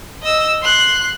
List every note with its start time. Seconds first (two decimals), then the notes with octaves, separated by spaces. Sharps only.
0.23 D#5 E6
0.62 C6 F#6